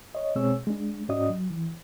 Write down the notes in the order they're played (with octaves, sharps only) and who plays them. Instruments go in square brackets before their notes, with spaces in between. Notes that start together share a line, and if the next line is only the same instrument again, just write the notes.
[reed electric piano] C#5 D#5
B2 G#3 C4 G#4 C#5 E6
G#3 D4
G#2 C#4 F#4 D5 D#5 D#6
F#3
E3